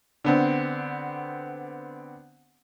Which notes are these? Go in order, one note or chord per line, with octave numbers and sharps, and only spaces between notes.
D3 B3 C4